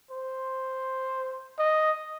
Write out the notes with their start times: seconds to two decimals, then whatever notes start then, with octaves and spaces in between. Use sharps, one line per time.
0.11 C5
1.59 D#5